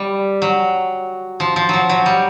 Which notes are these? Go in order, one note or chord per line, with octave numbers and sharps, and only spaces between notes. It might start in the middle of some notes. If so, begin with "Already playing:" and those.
Already playing: G3
F#3
F3
F3
F3 F#3
F#3
G3